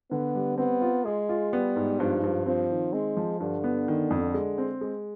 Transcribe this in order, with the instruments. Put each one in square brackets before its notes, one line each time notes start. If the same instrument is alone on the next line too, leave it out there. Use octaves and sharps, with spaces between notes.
[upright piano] D3 [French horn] B3
[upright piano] G3
[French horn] B3 [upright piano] C4
[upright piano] F4
[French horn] G#3 [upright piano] G#4
[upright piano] F4
[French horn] G3 [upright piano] B3
[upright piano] G#2
[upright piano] G2 [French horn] F3
[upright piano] G2
[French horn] F3 [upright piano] C4
[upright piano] D#3
[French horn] G#3 [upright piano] C4
[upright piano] F3
[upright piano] G2 [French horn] D3
[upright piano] B3
D#3
F2
G#3
C4
G#3